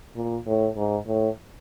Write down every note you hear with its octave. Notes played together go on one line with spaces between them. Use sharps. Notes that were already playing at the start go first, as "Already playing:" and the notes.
A#2
A2
G#2
A2